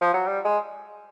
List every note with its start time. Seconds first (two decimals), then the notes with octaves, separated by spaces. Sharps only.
0.01 F3
0.13 F#3
0.26 G3
0.45 G#3